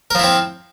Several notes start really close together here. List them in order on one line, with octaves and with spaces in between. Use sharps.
A#4 F3 E4 C4